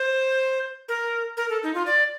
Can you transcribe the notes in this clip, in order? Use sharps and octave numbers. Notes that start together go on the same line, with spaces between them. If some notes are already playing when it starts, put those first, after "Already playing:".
Already playing: C5
A#4
A#4
A4
D#4
F4
D5